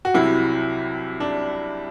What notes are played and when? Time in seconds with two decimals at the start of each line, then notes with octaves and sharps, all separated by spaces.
0.05 F#4
0.15 C2 C3 F#3 E4
1.20 D4